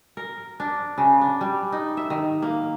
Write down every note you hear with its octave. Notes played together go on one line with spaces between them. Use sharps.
A#4
D4
C#3
D4
G3
D#4
E5
D#3
A#3